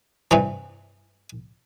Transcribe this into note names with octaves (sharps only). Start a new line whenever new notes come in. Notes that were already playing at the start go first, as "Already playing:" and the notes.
G2 C3 E3